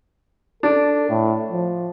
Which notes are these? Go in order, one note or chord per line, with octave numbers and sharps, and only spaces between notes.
D4 A4
A2
F3